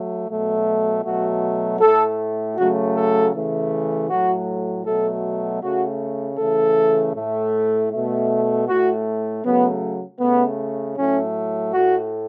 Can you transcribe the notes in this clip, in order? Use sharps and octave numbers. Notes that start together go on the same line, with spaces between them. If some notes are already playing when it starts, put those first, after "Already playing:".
Already playing: F#3 A3
B2 F#3 A3
B2 F#3 A3 F#4
A2 A3 A4
C#3 F#3 A3 F#4
A4
C#3 E3 A3
A2 F#3 A3 F#4
B2 F#3 A3 A4
C#3 A3 F#4
C#3 E3 A3 A4
A2 A3
B2 A3
A2 A3 F#4
C#3 F#3 A3 B3
C#3 A3 B3
A2 F#3 A3 C#4
A2 A3 F#4